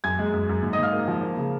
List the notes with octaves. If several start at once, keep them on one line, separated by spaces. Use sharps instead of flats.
F#2 G#5 G#6
G#3
F#2
F#2
G#2
D#5 D#6
G#2 F5 F6
A#3
F3
A#3
C#3